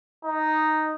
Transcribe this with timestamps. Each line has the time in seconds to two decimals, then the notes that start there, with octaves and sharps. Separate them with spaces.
0.24 D#4